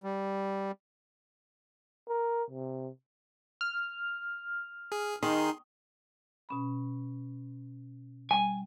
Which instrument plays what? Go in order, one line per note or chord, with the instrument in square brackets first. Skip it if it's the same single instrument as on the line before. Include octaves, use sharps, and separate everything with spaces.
[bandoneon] G3
[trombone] A#4
C3
[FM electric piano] F6
[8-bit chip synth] G#4
[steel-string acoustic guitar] D#3 [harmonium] D#4 [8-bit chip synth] G#4 C6
[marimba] B2 C#4 B5
[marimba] G3 [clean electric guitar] G#5